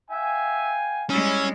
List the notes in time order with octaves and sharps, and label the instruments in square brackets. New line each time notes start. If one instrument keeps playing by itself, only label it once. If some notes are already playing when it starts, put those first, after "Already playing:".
[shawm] E5 [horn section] F5 G5 G#5
[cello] G3 G#3 [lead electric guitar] C#4 [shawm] E4